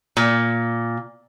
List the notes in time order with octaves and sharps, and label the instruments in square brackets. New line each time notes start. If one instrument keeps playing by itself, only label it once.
[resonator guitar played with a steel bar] A#2